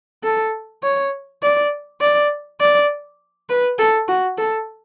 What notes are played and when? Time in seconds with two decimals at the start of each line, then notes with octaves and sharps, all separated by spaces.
0.23 A4
0.83 C#5
1.42 D5
2.01 D5
2.61 D5
3.49 B4
3.79 A4
4.08 F#4
4.38 A4